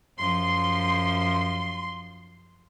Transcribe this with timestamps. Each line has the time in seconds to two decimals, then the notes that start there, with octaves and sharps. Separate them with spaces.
0.18 F#2 F3 C6